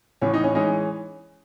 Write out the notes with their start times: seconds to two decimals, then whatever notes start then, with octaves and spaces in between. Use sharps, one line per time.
0.22 A2 E3 B3 C#4
0.34 D#4
0.44 C#4
0.55 E3 G#3 C#4 D#4